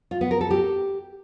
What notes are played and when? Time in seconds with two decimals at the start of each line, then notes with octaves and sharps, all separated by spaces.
0.11 F4
0.21 B3
0.31 A#4
0.41 A4
0.51 G4